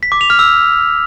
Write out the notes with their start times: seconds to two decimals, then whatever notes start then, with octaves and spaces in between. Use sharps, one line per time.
0.03 B6
0.12 D6
0.21 F7
0.30 F6
0.39 E6